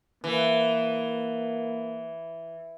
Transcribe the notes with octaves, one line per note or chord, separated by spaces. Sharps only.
E3 A#3